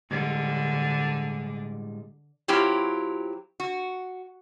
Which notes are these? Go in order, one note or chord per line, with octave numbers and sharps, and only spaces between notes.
A2 D3 G3 G#3 D4
F#3 C4 E4 F4 G4
F#4